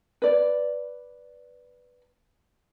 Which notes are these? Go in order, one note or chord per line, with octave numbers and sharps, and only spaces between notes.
B4 D5